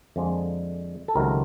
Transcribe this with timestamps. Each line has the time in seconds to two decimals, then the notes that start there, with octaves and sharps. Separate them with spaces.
0.16 F2 D3 F3 G#3
1.08 A4
1.15 C#2 C3 D#3 F#3 A3 A#4